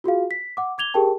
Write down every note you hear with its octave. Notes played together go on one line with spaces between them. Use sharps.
F4 F#4 G#4 F5
B6
F#5 D6
D6 G#6 F7 G7
G4 G#4 A#4 G5 A5